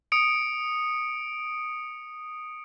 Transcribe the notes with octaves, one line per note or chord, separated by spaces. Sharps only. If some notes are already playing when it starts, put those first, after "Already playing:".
D#6 C#7 D7